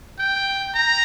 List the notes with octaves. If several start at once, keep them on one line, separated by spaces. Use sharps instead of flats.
G5
A#5